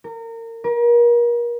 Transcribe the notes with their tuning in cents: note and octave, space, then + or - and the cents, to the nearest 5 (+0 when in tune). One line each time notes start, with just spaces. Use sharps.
A#4 -30
A#4 +35